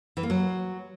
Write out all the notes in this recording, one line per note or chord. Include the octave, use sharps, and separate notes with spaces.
E3
A#3
F#3